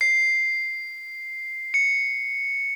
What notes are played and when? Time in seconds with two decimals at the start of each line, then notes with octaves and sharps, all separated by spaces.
0.01 C7
1.74 C#7